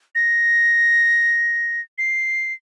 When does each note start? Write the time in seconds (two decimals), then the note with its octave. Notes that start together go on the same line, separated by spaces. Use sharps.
0.15 A#6
1.98 C7